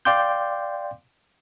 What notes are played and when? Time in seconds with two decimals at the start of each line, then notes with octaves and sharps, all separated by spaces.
0.05 D5 F5 G5 C6 D6 G6